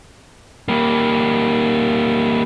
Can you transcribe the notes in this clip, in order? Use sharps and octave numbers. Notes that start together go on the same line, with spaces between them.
G3 A#3